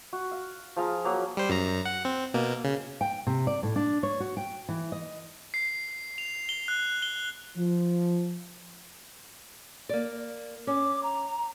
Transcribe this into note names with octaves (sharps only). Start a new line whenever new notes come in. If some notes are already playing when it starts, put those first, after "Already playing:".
F#4
F5
F3 G#4 F5 A#5
F#3 A#3
G3 C5
F#2 A#5
F#5
C4
B2 A#3
C#3
G5
C3
D5
A2
D4
C#5
F#4
G5
E3
D#5
C7
F7
G7
F#6
G7
F3
A#3 D5
C#4 D6
A#5